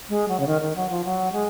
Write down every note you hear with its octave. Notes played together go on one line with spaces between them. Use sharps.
G#3
F#3
C#3
D#3
D#3
F#3
F3
F#3
G#3